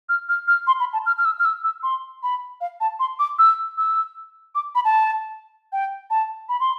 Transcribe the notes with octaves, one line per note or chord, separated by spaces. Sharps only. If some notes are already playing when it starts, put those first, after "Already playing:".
F6
F6
F6
C6
B5
A5
F6
F6
E6
F6
E6
E6
C6
B5
F5
A5
C6
D6
E6
E6
D6
B5
A5
G5
A5
B5
C6